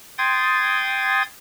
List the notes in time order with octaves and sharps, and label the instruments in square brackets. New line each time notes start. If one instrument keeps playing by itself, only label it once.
[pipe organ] G5 C6 D#6 G#6 A6